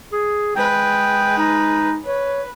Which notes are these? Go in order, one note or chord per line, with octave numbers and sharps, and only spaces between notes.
G#4
G#3 B4 G5
D#4
B4 C#5